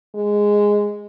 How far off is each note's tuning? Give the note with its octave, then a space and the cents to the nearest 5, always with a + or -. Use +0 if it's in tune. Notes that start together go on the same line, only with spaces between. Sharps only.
G#3 -5